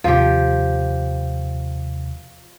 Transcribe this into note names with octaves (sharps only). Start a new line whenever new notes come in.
D#2 C3 F3 G4